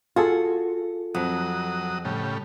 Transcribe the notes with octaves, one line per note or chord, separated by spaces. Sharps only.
F4 F#4 G#4 A4
F2 F#3 D#6
A2 C#3 G3